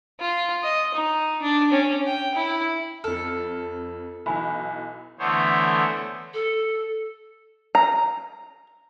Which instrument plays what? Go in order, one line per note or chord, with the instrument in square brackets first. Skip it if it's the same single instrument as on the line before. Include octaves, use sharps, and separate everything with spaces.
[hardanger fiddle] F4
D#5
D#4
D4
C#4
G5
E4
[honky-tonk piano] F2 F6 [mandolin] A4
[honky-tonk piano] B1 E3 [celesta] G#5 B5
[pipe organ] D3 E3 A3 B3 C5 C#5
[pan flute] A4
[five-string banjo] A#5